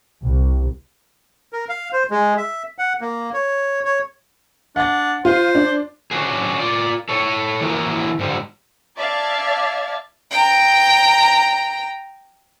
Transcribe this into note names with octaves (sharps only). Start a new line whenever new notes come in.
C2
A#4
F5
C5
G#3
E5
F#5
A#3
C#5
C#5
D4 F#5 A6
F4 C5
D4
C#4 D4 F#4 G#4
F4 D5
A4 C#5
E3 A#3 E4 F#4 A#4
G#2 D3 G3
D5 E5 F5 A5 G#6 A6
G5 A#5